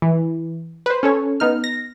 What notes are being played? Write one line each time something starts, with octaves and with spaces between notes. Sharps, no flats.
E3
B4 C5
C#4 A4 C#5
B3 D#4 F6
A#6